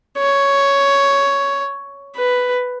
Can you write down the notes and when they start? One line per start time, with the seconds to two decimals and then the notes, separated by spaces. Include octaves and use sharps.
0.18 C#5
2.16 B4